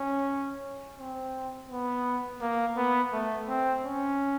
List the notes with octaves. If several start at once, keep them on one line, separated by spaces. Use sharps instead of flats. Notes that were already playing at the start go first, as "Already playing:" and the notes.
Already playing: C#4
C4
B3
A#3
B3
A3
C4
C#4